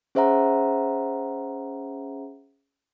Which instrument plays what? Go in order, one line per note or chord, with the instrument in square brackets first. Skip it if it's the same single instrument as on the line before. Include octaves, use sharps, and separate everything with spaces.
[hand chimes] C#4 G#4 C5 E5 F#5 A#5